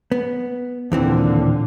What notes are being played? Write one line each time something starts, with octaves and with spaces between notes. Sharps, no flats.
B3
D#2 A#2 D3 E3 C4